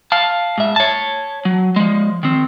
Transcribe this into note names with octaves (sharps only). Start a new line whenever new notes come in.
F5 A5
G#2 E5
C#5 A5
F#3
F3 G#3
D#3 C4